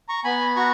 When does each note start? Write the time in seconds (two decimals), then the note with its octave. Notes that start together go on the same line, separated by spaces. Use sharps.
0.09 A#5 C#6
0.24 B3 G#5 B5
0.56 F#4 A#5 C#6